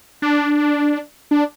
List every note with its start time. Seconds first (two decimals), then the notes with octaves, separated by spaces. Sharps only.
0.22 D4
1.31 D4